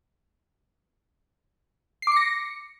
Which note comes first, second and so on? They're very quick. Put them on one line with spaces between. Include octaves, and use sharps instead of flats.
C7 D6 C#7 A#6